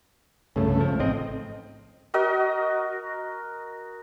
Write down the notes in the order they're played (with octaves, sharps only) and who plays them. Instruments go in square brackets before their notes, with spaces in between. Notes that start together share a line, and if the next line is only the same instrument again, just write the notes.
[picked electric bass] C2 G2 [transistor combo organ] C#3 A3
[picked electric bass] F3
[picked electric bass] A1 G#2 C4 [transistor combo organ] D#5
[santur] F#4 A#4 D#5